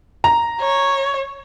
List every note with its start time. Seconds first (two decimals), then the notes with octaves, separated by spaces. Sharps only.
0.24 A#5
0.61 C#5